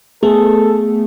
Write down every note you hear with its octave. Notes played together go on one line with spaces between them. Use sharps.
A3 B3 G#4 A4